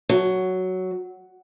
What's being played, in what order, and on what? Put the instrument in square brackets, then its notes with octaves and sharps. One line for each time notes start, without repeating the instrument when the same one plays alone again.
[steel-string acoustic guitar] F#3